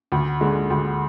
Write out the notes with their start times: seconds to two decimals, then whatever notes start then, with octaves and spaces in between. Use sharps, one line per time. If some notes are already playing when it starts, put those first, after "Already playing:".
0.12 D2
0.41 D3 G#3
0.70 D2